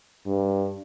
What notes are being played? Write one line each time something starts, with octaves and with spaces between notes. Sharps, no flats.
G2